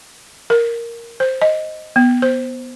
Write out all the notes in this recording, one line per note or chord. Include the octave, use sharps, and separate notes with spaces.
A#4
C5
D#5
B3
C5